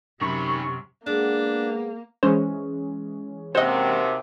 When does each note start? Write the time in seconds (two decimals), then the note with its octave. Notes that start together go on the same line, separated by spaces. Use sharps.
0.21 F#2 C3 D#3 F#3 B5 C#6
1.06 G#3 A#3 B3 D4 F#5
2.23 E3 G#3 C#4 C5
3.55 D#2 C3 C4 F#4 C5 D#5